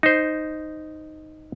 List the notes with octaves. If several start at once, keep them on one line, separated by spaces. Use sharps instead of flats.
D#4 C5